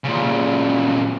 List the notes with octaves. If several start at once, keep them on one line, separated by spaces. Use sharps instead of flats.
A#2 C#3